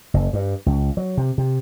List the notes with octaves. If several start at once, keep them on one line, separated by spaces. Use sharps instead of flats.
F#1
G2
C#2
F#3
C3
C3